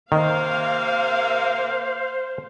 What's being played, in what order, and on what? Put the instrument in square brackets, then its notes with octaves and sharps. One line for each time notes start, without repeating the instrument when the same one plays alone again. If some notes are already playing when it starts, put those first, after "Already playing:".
[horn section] C3 A#3 [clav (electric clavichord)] D#3 [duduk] C5 [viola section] F5